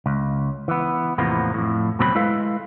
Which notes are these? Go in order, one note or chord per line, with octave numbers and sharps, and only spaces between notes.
C#2
E3 B3
E2 A2 C3 F3 A#3 B3
F2 A2
D2 B2 F#3 C4 F#4 B5
G#3 E4 A4 B4 F5